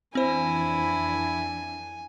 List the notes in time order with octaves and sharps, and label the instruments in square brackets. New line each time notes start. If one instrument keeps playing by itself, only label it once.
[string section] F2 E3 D4 [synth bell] C4 C5 [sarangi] E4 [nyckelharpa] G#5